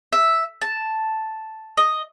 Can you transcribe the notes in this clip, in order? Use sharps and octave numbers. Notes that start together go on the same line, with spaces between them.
E5
A5
D#5